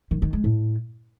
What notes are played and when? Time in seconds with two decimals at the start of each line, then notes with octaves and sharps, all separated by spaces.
0.11 D#3
0.22 D#3
0.33 G#3
0.44 A2